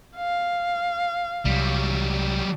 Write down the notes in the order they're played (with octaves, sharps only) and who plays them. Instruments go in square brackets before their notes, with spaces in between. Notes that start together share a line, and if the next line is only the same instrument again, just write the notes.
[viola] F5
[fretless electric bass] C2 [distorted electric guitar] F#3 G3